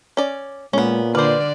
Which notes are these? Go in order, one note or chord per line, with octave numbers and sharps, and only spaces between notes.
C#4 D5
A#2 G#3 A#3 B3 C#4
D3 B4 C5 D5 D6 F6